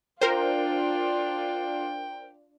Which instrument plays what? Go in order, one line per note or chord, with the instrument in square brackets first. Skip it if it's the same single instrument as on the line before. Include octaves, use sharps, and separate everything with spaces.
[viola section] D4 F4 [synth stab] A#4 C5 [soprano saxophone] G5